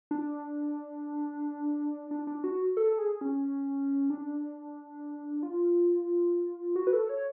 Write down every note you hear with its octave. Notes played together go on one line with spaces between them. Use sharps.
D4
D4
D4
F#4
A4
G#4
C#4
D4
F4
F#4
B4
A4
C#5